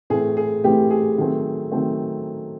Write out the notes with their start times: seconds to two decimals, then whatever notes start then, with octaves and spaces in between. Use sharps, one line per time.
0.10 A2 E3 A3 C4 G#4
0.37 G#4
0.64 A2 E3 A3 C4 G4
0.90 G#4
1.18 D#3 F#3 A3 C4
1.72 D#3 F#3 A3 C4